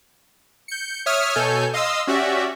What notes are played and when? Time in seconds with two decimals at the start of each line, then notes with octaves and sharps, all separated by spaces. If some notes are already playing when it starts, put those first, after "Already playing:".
0.68 G6 C#7
1.06 C#5 E5 D#6 F6
1.35 B2 A4 C#5 G#5 G6
1.73 D#5 F5 C6 D#6 E6
2.07 C#4 F#4 G4 D5 E5